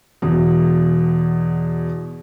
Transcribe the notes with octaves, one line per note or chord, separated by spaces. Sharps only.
E2 B2